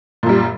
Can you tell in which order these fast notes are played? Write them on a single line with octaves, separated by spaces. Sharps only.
A#2 F#2 G3